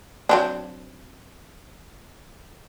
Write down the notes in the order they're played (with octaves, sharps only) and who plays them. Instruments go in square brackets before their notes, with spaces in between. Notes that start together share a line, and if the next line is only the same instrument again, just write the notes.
[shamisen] F#3 C4 D4